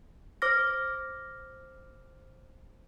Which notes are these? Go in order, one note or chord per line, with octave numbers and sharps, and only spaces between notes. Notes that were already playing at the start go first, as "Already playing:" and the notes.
C5 D6 F6 A#6